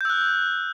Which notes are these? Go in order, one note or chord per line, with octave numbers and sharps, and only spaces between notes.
E6 F#6 G6